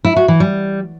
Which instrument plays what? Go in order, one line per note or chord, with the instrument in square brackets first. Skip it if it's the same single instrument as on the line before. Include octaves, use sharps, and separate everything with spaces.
[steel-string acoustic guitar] E4
F#4
E3
G3